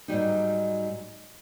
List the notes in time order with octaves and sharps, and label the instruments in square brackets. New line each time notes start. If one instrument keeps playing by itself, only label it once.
[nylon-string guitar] G#2 F#3 G3 D#4